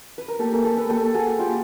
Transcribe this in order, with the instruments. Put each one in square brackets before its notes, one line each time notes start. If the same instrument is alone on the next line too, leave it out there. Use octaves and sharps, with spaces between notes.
[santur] B4
A#4
[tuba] A#3 [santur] G4 A4
[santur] G#4 A#4
G4 A4
A4 B4
[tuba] A#3 [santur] G4 A4
[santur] F#4 G#4
F4 G4